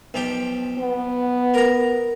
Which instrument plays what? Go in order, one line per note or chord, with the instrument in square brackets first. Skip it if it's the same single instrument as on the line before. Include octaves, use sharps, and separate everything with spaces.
[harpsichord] B1 F3 G4
[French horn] B3
[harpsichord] A#4 A#5